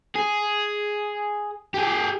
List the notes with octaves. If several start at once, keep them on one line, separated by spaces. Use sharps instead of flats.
G#4
G4 G#4